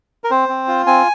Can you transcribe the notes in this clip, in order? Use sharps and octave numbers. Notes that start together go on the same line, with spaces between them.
A#4
C4 C5
C4
F4
C4 G#5